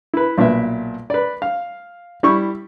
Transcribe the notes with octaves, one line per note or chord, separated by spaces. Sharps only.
E4 B4
B1 A#2 B4 E5
B4 D5
F5
G3 E4 C#6